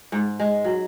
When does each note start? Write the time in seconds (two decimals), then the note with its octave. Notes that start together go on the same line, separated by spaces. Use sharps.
0.12 G#2
0.40 G#3
0.64 F#3